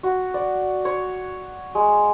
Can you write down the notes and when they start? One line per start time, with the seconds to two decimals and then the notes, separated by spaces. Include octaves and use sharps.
0.03 F#4
0.34 D5
0.85 C#5
1.75 G#3